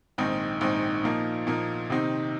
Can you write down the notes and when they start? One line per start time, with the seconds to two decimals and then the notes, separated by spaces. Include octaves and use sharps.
0.18 A#1 G#2 D#3 C4 D#4
0.61 A#1 G#2 D#3 C4 D#4
1.04 A#2 F3 A#3 D#4
1.47 A#2 F3 A#3 D#4
1.90 C3 D#3 C4 D#4